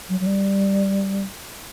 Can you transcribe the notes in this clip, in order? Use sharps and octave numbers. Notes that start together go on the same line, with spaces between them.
F#3
F#3
G3